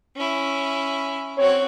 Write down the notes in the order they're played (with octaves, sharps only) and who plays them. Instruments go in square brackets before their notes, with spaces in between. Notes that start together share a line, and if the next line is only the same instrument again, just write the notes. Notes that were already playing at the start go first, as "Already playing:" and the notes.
[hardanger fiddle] C#4 E4
[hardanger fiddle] C4 F#4 [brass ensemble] C#5